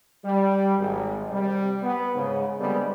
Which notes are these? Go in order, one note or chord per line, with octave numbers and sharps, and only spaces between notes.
G3
G#1
C3 G3
B3
G#2 C#3
D3 G3 G#3 B3 C4